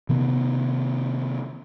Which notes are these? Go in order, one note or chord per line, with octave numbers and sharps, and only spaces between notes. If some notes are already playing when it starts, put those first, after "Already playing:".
C3 D#3 B3